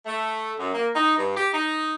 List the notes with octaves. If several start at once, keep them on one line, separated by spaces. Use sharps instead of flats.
A3
F#2
A#3
D#4
G2
G4
D#4